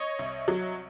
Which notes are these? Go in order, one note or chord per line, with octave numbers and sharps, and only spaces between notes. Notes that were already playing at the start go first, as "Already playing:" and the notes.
Already playing: C#5 D#5
C2
F#3